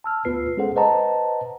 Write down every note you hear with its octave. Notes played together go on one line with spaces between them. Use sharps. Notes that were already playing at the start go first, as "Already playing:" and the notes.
A5 E6 F6
D2 B3 F4 B4 C7
G#3 C#4 G#4 A4 C5 F#5
B4 C5 D#5 F#5 A5 A#5